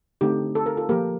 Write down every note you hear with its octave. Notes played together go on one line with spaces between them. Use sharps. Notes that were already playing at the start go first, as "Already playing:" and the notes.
D3 A3 C4 D#4 G4
A4
A#4
F4 A4
F3 A#3 G4 A#4